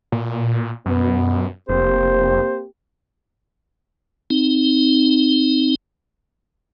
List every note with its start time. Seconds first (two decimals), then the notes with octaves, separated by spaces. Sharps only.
0.12 A#2
0.86 F#2 B2 B3
1.69 F1 A#3 C4 G4 C5
4.30 C4 D#4